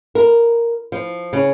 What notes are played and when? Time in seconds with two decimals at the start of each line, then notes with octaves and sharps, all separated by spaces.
0.15 A#4
0.92 F3
1.33 C#3